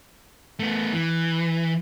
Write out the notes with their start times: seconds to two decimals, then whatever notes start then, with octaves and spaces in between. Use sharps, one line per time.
0.59 A3 B3
0.93 E3